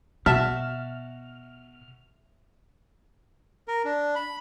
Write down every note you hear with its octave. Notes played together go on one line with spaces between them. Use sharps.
B2 F#4 E5 A5 F6
A#4
D4
B5